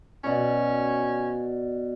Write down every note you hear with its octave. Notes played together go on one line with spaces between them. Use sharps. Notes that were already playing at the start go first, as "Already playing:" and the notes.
B2 C#4 D5